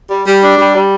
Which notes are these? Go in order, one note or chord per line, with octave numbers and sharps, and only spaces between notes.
G3
G3
D4
G3
G3